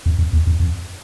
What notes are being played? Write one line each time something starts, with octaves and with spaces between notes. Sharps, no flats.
F2
F2
E2
F2
F2